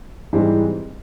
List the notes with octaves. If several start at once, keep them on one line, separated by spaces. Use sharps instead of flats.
G#2 E3 G3 C4